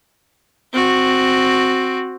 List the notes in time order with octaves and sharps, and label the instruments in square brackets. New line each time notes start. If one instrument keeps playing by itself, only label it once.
[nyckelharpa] C4 F#4